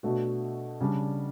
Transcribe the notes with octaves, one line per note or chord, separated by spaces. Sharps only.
B2 A3 D4 F#4
C#3 G3 D4